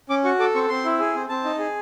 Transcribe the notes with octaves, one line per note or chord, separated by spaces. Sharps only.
C#4 D6
F#4 C#6
A4 D6
C4 C#6
C4 C6
E4
G#4
C4
C4 A5
D#4
G#4